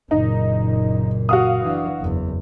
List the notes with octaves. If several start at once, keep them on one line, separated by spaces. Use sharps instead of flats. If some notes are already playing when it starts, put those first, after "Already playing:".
F#1 A#2 D#4
F#4 F5 D#6
E3 D4
F#1 E2